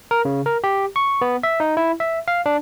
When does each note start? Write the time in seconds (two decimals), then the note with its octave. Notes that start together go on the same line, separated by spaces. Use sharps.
0.11 A#4
0.25 C#3
0.46 A#4
0.64 G4
0.96 C#6
1.21 B3
1.43 E5
1.60 D#4
1.77 E4
2.00 E5
2.28 F5
2.46 D4